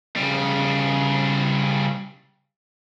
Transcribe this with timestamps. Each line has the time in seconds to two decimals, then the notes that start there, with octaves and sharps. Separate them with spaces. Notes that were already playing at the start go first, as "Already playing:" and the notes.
0.16 C#3 G3